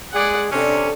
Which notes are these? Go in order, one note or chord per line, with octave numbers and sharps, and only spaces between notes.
G#3 G#4 D5 F#5
C3 C#4 D4 A4